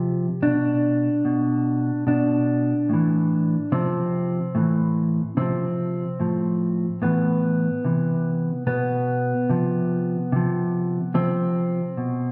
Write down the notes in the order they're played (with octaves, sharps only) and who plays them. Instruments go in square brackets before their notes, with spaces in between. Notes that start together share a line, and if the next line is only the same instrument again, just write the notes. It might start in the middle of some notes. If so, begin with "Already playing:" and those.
Already playing: [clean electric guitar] C3 F3 G4
B2 D4
B2
B2 D4
A2 E3
C3 F3 C4
A2 E3
C3 F3 C4
A2 F3
A2 E3 B3
C3 E3
B2 B3
C3 F3
C3 F3
C3 F3 C4
B2